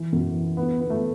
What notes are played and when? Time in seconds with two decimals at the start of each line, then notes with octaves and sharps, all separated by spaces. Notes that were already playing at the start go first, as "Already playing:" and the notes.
Already playing: E3
0.13 F#2
0.35 E3
0.57 D2 B3
0.79 D3 B3
0.90 A3